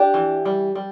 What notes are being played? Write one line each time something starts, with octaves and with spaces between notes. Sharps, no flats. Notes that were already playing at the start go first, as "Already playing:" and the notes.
Already playing: D4 G4
E3
G3
G3